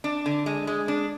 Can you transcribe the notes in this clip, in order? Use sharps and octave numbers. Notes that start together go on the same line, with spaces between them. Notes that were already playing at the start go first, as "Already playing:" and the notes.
D4
D3
G#3
G#3
D4